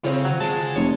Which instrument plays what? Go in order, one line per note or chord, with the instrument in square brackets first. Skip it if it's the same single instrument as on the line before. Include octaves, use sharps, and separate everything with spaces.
[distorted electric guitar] C#3 C#5 [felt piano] C4 F4
[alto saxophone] F#3
[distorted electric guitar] G#3 [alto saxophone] A5
[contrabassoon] F1 [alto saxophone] C#5